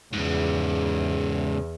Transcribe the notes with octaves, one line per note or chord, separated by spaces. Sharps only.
E2 G#2 C#3